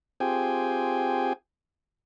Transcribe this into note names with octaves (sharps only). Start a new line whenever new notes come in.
C4 F4 G4 G#4 G5 G#5